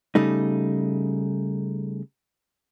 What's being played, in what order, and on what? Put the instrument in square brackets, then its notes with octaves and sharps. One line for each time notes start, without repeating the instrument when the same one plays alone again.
[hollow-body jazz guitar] C#3 G3 A3 D#4